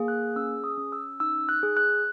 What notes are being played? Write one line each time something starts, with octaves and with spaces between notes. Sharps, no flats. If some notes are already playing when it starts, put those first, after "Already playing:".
Already playing: A#3 G#4
F#6
C#4 E6
D#6
C#4
E6
D#4 E6
F#6
G#4
F#6